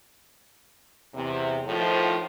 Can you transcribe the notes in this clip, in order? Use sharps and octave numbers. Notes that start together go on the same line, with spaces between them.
E2 C3
A2 D#3 F3